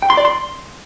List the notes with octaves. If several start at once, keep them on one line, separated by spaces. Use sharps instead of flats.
G5
C6
D5
C6